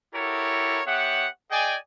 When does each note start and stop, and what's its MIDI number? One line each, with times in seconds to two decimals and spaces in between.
0.14 0.81 64
0.14 0.81 66
0.14 0.81 67
0.14 0.81 69
0.14 0.81 70
0.14 0.81 73
0.87 1.27 59
0.87 1.27 67
0.87 1.27 73
0.87 1.27 76
0.87 1.27 78
1.51 1.76 68
1.51 1.76 74
1.51 1.76 75
1.51 1.76 79
1.51 1.76 80